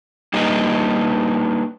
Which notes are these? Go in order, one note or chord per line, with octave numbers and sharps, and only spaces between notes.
G3 A#3 D4 D#4 B4 D#5